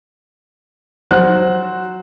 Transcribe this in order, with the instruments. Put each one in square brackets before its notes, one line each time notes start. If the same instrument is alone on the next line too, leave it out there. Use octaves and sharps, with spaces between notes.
[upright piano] F#3 F#4 C5 F#6